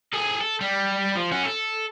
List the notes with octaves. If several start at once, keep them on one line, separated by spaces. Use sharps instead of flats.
G#4 A4
A4
G3
F3
C#4 F#4
A4